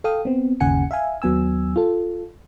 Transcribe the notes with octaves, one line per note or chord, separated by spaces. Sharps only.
A4 F5 G5 D#6
B3 C4
G1 D#2 C#3 F#5 G#5 C#7
E5 F5 G#5
D#2 F#3 B3 G#5 E6
F4 A4